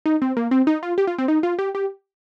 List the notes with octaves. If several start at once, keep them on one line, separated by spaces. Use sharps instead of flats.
D#4
C4
A#3
C4
D#4
F4
G4
F4
C4
D#4
F4
G4
G4